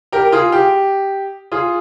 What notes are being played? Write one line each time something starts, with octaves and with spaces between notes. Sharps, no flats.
G4 A#4
F4 G#4
G4
F4 G#4